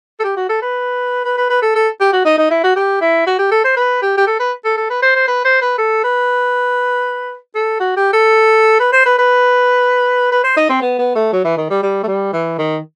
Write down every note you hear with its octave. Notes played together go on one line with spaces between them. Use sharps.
A4
G4
F#4
A4
B4
B4
B4
B4
A4
A4
G4
F#4
D#4
D#4
E4
F#4
G4
E4
F#4
G4
A4
C5
B4
G4
G4
A4
B4
A4
A4
B4
C5
C5
B4
C5
B4
A4
B4
A4
F#4
G4
A4
B4
C5
B4
B4
B4
C5
D#4
C4
B3
B3
A3
F#3
E3
D#3
G3
G3
A3
G3
E3
D#3